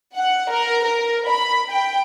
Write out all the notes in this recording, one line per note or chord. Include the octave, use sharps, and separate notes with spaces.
F#5
A#4
A#4
B5
G5